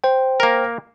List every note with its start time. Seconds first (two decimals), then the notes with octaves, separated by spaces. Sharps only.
0.04 C5 G5
0.40 A#3 A#4